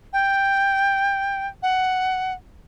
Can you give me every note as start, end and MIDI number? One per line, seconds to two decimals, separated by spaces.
0.13 1.47 79
1.63 2.33 78